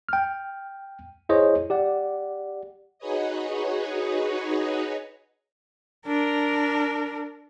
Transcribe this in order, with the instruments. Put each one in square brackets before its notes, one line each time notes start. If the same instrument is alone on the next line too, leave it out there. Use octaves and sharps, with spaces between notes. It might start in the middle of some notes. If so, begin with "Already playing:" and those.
[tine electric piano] G5 F6
E4 G#4 C5 C#5 D#5
G4 D5 F#5
[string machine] D#4 F#4 G#4 B4 C#5 D#5
[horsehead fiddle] D4 A#4